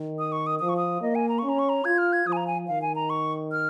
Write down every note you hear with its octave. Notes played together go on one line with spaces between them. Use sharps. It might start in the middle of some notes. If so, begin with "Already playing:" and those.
Already playing: D#3
D#6
C#6
D#6
F3 D#6
C#6
D#6
A#3 D#5
G#5
A#5
C#4 C#6
A#5
C#6
A#5
F4 G#6
F6
G#6
F3 D#6
G#5
A#5
G#5
D#3 F5
G#5
A#5
C#6
F6